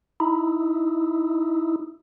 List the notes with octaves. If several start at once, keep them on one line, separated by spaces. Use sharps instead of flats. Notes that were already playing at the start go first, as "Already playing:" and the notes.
D#4 E4